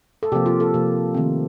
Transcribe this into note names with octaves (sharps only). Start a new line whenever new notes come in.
A4
C3 F3 A#3 G4
F4
A4
C3 F3 A#3
D#3 A3 C4